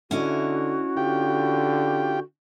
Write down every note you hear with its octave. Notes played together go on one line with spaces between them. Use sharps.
D3 C#4 E4 F#4 D#5
D3 F4 G4 G5